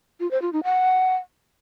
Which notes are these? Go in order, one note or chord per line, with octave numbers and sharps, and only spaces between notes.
F4
C5
F4
D#4
F#5